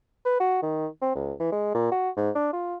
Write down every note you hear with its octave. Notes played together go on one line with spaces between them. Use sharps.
B4
F#4
D#3
C4
C#2
E3
G#3
A#2
F#4
G#2
D4
F4